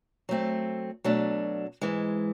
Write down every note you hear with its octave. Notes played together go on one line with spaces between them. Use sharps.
F#3 A3 C4
B2 F#3 A3 D4
G#2 E3 G#3